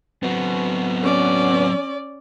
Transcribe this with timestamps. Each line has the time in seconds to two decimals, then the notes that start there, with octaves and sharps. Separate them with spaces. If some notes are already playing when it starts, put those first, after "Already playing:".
0.23 F#3 B3 C4 F#4
1.04 C#4 D5